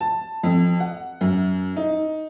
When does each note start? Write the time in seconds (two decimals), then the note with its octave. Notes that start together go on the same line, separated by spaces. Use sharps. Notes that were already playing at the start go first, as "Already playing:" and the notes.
0.01 A5
0.43 F2
0.80 F#5
1.21 F#2
1.76 D#4